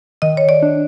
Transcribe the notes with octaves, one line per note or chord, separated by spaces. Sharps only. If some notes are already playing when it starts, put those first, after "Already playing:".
D#3 D#5
C#5
D5
D4